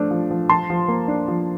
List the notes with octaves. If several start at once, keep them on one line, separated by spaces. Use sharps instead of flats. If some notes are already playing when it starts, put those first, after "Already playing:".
Already playing: F3 A3 D4
F3
F3
F3 A5 C6
F3
A#3
D4
F3